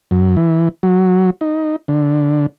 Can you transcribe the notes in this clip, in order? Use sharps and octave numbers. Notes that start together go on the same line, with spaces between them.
F#2
E3
F#3
D#4
D3